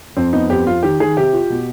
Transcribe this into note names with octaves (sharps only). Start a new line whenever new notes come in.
F2 C4
B3 D#4
F2 G4
F2 F4
D#3 G4
D#3 G#4
C3 G4
F4
B2